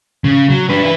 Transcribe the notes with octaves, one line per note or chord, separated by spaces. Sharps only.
C#3
F#3
D4 B4
E4 B4